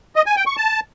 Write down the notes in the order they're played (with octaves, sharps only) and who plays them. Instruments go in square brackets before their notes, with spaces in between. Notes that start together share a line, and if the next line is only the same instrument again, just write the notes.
[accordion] D#5
G#5
G5
C#6
A5